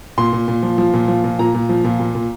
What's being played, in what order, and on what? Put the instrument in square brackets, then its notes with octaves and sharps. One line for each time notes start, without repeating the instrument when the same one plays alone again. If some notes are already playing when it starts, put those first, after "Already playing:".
[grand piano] A#2 C6
A#2
A#2
F3
F3
A#2
F3
A#2
A#2 A#5
A#2
F3
A#2
A#2
A#2